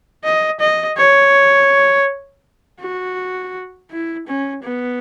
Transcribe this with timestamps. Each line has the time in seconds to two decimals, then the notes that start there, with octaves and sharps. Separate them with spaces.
0.24 D#5
0.60 D#5
0.98 C#5
2.80 F#4
3.91 E4
4.28 C#4
4.64 B3